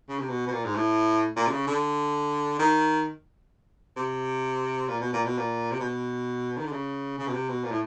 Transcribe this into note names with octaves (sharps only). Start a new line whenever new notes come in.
C#3
C3
B2
B2
A#2
G#2
A2
A#2
D3
C#3
D3
D#3
C3
A#2
B2
A#2
B2
A#2
C3
B2
D#3
D3
C#3
C#3
B2
C3
B2
A#2
A2